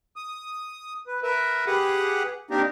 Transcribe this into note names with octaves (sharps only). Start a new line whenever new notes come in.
D#6
B4
A#4 B4 E5
G4 G#4 B4 F#5
A#3 C4 D4 D#4 G4 A#4